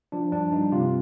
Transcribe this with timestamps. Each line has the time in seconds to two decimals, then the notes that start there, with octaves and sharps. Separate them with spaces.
0.12 F3 D4
0.32 G2 D4
0.52 G2 D#4
0.72 C3 F4